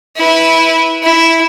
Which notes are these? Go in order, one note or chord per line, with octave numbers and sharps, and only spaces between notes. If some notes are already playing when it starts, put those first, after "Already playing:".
E4 B4
E4